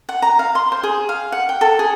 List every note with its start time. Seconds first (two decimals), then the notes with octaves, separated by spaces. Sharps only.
0.09 F#5
0.22 A#5
0.39 F5
0.55 C6
0.72 C5
0.83 G#4
1.09 F5
1.32 F#5
1.49 G5
1.61 A4
1.79 G#4